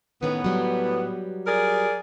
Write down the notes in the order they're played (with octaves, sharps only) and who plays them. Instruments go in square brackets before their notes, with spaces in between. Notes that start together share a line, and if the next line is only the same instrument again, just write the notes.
[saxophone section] A2 B3 [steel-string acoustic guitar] D#3 E3 C#4
[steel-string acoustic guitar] F#3 G3
[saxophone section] G#4 A#4 D5